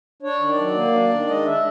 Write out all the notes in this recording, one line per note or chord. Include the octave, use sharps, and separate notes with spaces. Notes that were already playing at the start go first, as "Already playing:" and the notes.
D4 C#5
D#3
D5
F#3
A#3
D4
D#3
G#3 D#5
D4 E5